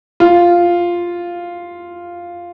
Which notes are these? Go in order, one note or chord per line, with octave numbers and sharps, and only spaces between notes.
F4